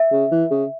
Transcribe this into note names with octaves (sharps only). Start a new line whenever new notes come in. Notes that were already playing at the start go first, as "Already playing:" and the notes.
Already playing: E5
C#3
E3
C#3